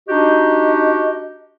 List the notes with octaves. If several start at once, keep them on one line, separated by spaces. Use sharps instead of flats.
D4 D#4 F#4 G4 D#5